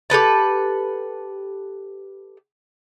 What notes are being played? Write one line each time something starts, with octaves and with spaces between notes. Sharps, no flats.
G4 A4 B4 A5